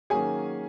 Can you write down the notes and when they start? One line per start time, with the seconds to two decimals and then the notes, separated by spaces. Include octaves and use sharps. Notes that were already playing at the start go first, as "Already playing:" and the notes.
0.10 D#3 F#3 A#3 C#4 G#4 G#5